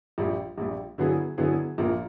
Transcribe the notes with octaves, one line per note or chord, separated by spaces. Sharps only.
A#1 A#2 G3
A#1 A#2 G3
D3 F#3 B3 E4 G#4
D3 F#3 B3 E4 G#4
A#1 A#2 F3 A#3